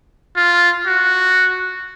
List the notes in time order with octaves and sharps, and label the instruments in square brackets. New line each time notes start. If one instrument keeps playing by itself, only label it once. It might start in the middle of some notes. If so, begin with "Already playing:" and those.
[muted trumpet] F4
F#4